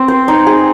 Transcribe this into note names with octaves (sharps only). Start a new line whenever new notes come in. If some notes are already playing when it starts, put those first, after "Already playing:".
Already playing: C4
C5
D#4
G#4